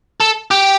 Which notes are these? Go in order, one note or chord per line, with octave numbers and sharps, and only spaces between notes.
A4
G4